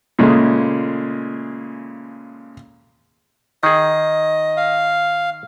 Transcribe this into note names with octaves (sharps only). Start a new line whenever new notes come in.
A#2 C#3 G#3 A3
D#3 G#4 D#5
F5